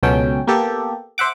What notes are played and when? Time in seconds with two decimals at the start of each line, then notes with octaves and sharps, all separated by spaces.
0.03 C#2 B2 F#3 C#4 A4 G5
0.47 A#3 B3 G4 A4
1.18 C5 E5 F#5 D6